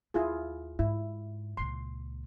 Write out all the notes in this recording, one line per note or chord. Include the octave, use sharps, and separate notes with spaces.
D#2 E4 F4 G#4
G#2 E4
C#2 A#2 C6